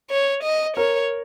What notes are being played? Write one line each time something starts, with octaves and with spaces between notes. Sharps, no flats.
C#5
D#5
A#4 C#5